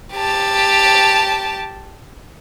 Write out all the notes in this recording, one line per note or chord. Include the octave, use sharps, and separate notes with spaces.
G4 A5